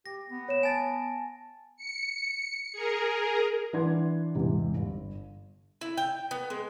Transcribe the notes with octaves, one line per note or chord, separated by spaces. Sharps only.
G4 A#6
B3
C#5 E7
G#5 A5 A6 D7
C#7
G#4 A#4
E3 D4 F#5 C6 G#6
E2 G#2 C3
G1
E4
G5
B3
G#3